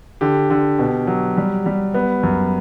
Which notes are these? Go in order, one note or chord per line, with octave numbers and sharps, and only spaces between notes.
D3 G4
D3
B2
F#3
G3
G3
B3
F#2